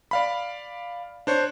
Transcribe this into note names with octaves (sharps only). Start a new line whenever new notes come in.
D5 F5 B5
D4 C5 C#5